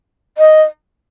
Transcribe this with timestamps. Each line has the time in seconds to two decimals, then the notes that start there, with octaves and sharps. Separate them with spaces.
0.38 D#5